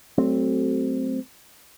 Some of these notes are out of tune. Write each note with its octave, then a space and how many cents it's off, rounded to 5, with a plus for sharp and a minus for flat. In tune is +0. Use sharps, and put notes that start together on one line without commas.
F#3 +30 A3 +0 C4 +0